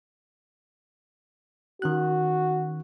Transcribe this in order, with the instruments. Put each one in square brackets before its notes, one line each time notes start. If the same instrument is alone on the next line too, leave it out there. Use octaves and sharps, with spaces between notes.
[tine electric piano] D#3 C#4 F#6 [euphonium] F#4